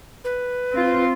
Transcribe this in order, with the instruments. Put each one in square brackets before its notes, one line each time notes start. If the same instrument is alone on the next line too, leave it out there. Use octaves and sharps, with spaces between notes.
[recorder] B4
[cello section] C4 F4